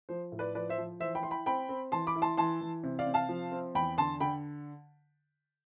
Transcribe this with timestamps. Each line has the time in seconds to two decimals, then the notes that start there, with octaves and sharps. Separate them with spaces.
0.09 F3 C5
0.32 A2
0.39 B4 D5
0.55 F3 B4 D5
0.69 C5 E5
0.78 F3
1.00 E3 C5 E5
1.15 G5 B5
1.23 E4 C6
1.31 G5 B5
1.46 C4 G5 B5
1.69 C4
1.92 E3 A5 C6
2.07 B5 D6
2.15 E4
2.22 A5 C6
2.37 E3 A5 C6
2.61 E3
2.84 C3
2.99 D5 F5
3.06 C3
3.14 F5 A5
3.29 F3
3.52 C4
3.75 E2 G5 B5
3.98 D3 A5 C6
4.20 D3 G5 B5